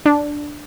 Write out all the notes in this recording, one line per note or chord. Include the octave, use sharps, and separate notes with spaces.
D4